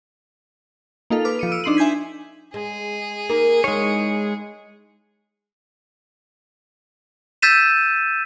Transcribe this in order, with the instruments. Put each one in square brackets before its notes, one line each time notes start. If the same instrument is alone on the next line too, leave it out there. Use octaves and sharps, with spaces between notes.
[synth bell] A#3 D#4 F4 A4 F7
B4 D6 F6
F3 C#7 D#7
E6 D7 D#7
D4 D#4 C6 C7 D#7 F#7
E5 G#5 G6 G#6 B6
[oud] G#3 [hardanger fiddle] G#4
[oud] A#3 D#4 A#4
[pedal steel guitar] G#3 C#5 [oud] D#4 E4 F5
[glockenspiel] E6 G6 A6 B6 D#7 E7